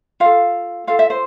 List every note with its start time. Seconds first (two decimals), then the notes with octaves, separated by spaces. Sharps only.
0.20 F4 A4 F5
0.87 F4 A4 F5
0.99 E5
1.10 C5